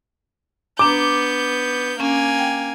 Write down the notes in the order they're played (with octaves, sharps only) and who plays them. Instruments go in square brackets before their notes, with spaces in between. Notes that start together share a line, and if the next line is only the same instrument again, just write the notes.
[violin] B3 G6 [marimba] D4 A#5 [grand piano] D6
[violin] A#3 G#5 [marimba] C#4
[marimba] G5